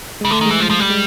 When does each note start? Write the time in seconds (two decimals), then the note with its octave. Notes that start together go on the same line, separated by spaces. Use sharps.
0.21 C#3 G#3
0.31 D3 A3
0.41 D#3
0.46 E3 G#3
0.60 F3
0.71 F3
0.80 G3
0.90 G#3